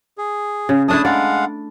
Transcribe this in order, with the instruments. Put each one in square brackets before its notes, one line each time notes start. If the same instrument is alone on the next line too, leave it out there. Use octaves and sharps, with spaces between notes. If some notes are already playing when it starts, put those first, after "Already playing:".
[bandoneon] G#4
[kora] C#3
[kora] A3 D4 E4 [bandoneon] A5 D#6
[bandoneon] G#3 F5 F#5 [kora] D5